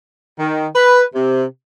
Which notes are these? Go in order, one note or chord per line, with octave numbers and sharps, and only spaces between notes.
D#3
B4
C3